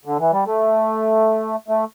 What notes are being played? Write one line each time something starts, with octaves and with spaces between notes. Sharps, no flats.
D3
E3
G3
A3
A3